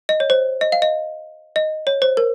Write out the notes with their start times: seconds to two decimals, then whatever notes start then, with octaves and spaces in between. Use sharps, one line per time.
0.09 D#5
0.20 C#5
0.30 C5
0.61 D#5
0.72 F5
0.82 D#5
1.56 D#5
1.87 C#5
2.02 C5
2.17 A#4